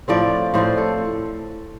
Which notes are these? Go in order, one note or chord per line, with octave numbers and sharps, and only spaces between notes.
A2 F3 C4 D5
A2 F3 C4 C5
A4